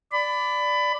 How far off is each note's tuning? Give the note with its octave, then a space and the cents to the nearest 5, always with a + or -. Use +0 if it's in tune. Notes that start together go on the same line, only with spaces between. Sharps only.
D5 +0 B5 +20